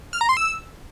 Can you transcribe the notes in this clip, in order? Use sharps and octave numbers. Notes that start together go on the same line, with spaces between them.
F6
A#5
C6
E6